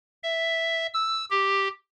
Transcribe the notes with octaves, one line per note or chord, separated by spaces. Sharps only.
E5
E6
G4